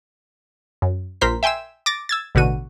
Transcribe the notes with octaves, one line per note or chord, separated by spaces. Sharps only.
F#2
A#1 A#4 C5 B6
E5 G5 G#5 C6 E6
D6 A6 A#6
E6 G#6 A6
A1 B2 D3 F#4 D#7